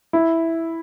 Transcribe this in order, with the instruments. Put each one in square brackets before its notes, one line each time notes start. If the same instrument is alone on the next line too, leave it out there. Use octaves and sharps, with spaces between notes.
[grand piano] E4